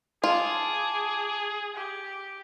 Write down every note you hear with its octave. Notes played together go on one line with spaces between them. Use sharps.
F4 G#4 A5 D6
G4